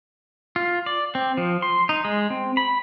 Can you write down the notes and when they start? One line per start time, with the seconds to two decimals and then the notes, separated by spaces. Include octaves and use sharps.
0.56 F4
0.86 D5
1.15 C4
1.37 F3
1.62 C6
1.89 D#4
2.05 G#3
2.30 C4
2.57 B5